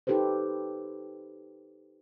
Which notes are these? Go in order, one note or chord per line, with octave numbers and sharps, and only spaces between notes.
D#4 G4 A4 B4 C5